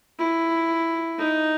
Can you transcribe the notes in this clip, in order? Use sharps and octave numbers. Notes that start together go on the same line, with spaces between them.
E4
D#4